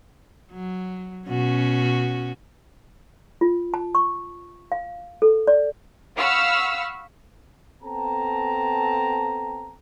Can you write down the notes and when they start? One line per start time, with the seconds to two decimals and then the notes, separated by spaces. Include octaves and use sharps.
0.52 F#3
1.28 B2 C#4 F#4
3.41 F4
3.74 A5
3.95 C#6
4.72 F5
5.22 A4
5.47 D5
6.17 F5 F#5 B5 C#6 E6 F6
7.83 B3 C4 A4 G5 A5 A#5